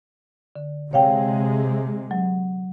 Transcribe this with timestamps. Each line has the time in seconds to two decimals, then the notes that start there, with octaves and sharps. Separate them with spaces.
0.56 D3
0.93 C3 G#3 C#5 F5 G5
2.11 F#3